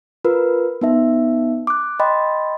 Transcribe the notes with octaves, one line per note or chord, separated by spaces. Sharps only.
F4 A#4 B4
B3 D#4 E5
D6 F#6
D#5 G5 B5 C6